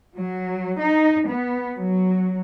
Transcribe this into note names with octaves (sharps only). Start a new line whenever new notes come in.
F#3
D#4
B3
F#3